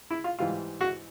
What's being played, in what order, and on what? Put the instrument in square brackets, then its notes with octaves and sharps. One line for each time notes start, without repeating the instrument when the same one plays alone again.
[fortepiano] E4
F4
G#2 E3 G3 F4
F#4